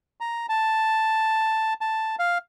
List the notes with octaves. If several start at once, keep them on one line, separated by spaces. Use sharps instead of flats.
A#5
A5
A5
F5